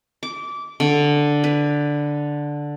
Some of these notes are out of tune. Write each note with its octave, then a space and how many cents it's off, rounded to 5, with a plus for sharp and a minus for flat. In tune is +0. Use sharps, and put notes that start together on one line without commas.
D6 -20
D3 +0
B4 +10